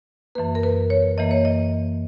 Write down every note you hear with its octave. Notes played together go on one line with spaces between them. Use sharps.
F#2 E3 A#3 B4
A#4
B4
C#5
F#2 E3 A#3 D#5
C#5
D#5